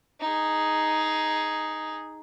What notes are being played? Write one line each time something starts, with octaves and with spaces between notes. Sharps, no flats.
D#4 G#4